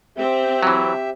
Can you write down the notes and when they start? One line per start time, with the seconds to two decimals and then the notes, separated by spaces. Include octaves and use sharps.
0.18 C4 G4 E5
0.63 E3 F#3